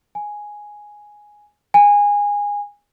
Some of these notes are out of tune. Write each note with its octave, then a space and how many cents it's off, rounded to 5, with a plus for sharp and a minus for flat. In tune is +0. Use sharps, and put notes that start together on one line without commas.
G#5 +0
G#5 -20